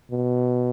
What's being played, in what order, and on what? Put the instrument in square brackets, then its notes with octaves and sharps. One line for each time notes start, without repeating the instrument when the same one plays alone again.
[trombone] B2